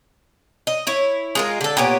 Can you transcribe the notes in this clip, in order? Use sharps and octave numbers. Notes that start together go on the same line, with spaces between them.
D#5
E4 C#5
G#3 F4 A#4
D3 A4
A#2 B3 G4 C#5